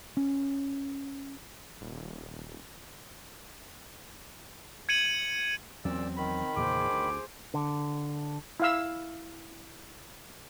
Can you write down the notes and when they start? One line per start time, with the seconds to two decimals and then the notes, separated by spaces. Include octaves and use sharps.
0.17 C#4
1.81 D#1
4.89 G#6 C#7 D#7 F#7
5.85 E2 A#2 F#3 C4 C#4 D5 E6
6.17 D#3 B5
6.56 E2 A#2 C#3 G#4 C5 D6
6.87 D2
7.54 D3
8.60 E4 F5 E6